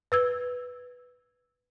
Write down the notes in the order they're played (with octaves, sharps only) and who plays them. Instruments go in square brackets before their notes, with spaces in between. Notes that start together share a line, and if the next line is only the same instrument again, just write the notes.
[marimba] B4 E6 G#6